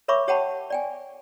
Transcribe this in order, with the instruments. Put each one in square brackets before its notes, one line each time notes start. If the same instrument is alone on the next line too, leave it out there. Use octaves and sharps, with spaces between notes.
[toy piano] A#4 C#5 E5 B5 C#6 D6
G4 C#5 F#5 G5 A5 B5
D5 G5 G#5